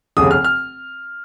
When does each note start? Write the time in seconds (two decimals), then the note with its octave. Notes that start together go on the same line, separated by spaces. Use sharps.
0.17 F1 D#2 C#3 D#6
0.31 F6
0.44 F6